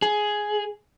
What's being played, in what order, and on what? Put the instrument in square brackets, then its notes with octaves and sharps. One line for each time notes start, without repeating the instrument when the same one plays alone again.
[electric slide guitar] G#4